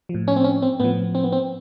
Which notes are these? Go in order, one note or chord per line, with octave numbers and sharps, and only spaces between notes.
F3
A2
C#4
C4
C#4
C4
A2 F3 B3
C4
B3
C4